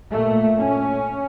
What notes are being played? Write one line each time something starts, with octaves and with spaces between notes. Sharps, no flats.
A#2 A3
C#4